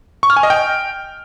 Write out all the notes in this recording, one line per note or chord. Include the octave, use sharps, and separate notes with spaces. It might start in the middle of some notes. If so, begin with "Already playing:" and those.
C#6
F6
G#5
D#5
G5